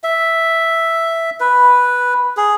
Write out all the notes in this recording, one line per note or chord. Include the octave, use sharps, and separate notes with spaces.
E5
B4
G#4